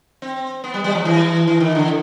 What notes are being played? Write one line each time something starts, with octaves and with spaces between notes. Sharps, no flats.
C4
B3
G3
G3
F3
E3
E3
D#3
D3